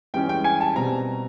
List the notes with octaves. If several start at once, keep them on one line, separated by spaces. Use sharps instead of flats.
G2 E3 G#3 C#4 G5
G5
G#5
A5
B2 G3 C4 A#5